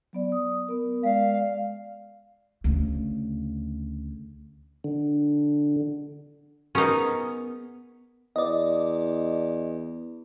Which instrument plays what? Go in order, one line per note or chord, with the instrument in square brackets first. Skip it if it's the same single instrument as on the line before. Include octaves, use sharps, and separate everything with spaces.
[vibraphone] F#3 B3 D5
D#6
B3 A#4
[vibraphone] G#3 D5 [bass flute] F5
[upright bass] D2 C#3
[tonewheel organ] D3
[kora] B3 G#4 A#4 [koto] C#4 D#4
[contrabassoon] E2 [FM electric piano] D5 D#5